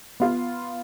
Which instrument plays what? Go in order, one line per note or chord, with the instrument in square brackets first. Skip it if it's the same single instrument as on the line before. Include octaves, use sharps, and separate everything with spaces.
[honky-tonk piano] B3 F4